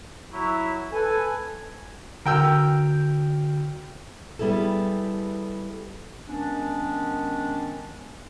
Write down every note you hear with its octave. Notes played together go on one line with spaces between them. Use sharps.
F#3 E4
A4 B4 G#5
D3 F#4 A#4 G5 E6 G6
G3 B3 E4 G#4 A4
D#3 G#3 B3 C#4 D4